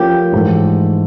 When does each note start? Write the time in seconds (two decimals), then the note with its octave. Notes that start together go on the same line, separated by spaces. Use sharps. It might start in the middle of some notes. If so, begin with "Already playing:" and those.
Already playing: F3 A3 C#4 F4 G4 A#4
0.32 G#2 E3 A3